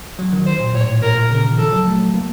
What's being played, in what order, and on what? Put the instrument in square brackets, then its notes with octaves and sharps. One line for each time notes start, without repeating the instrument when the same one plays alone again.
[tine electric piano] F#3
D#3
[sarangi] C5
[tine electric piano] A#2
[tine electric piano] A2 [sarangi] C#5
[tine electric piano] A#2 [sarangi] A#4
[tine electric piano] A#2
[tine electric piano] C#3 [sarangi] A#4
[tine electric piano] D#3
[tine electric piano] F3 [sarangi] A4
[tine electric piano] F#3
A3
A#3